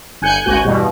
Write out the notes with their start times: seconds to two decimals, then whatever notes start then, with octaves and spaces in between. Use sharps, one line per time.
0.22 G1 G#5 F#6 G6 C#7
0.44 G#1 C#2 F#4 G#5 F#6 G6
0.65 E2 G2 B2